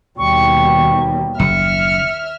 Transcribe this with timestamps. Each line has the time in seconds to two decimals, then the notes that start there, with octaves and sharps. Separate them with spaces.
0.18 D#2 B2 G3 C#6
1.39 F#1 E5 F6 C#7